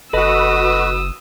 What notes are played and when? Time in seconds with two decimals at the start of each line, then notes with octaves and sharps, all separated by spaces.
0.13 F#1 F#4 A4 B4 D#5 D#6 E6